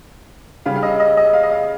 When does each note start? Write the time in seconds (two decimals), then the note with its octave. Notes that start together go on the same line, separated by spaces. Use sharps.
0.66 C#3 G3 F5
0.76 F5
0.83 D#5
1.00 D#5
1.17 D#5
1.33 F5
1.43 D#5
1.52 F5